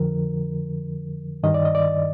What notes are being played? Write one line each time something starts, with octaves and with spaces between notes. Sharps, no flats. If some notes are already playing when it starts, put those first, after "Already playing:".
Already playing: F2 D3 F3 A#4
G2 D#3 D#5
D5
D#5
D5